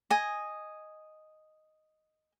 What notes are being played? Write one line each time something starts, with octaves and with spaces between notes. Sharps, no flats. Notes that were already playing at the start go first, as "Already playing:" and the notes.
D#5 G#5